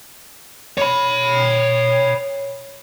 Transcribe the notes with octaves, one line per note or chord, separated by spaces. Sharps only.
C#5 B5